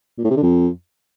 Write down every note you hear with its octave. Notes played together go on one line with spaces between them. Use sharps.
A#2
A2
C3
D3
F2